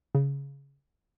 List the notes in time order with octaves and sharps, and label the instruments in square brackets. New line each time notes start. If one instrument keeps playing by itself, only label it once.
[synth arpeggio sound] C#3